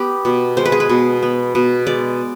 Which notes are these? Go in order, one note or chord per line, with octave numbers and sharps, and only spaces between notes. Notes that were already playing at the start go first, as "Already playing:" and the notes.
Already playing: B3 G4
B2
G#3 C5
B4
G#4
B4
B2
B3
B2
G#3 D5